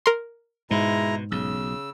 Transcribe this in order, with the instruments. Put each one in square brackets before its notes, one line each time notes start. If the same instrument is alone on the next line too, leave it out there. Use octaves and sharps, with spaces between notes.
[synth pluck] A#4 C6
[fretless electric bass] G#2 [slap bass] B2 [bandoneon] G#3 E4 A#5
[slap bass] B1 [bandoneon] C#3 E6